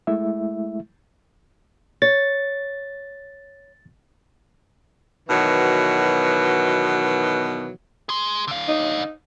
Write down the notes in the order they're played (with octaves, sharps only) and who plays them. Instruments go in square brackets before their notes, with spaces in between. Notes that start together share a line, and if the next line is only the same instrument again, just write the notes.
[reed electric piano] G#3 A3 E4 E5
[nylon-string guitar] C#5 [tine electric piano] A6
[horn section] B2 D#3 E3 F#3
[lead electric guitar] G#4 C6
D3 F5
[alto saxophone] D#4